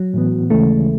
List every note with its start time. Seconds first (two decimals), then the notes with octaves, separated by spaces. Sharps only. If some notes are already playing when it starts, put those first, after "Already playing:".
Already playing: F#3
0.14 A2 E3 B3
0.50 D#2 C#3 E3 G#3 A3